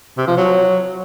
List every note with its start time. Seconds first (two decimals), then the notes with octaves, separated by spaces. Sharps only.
0.17 C3
0.27 F3
0.37 F#3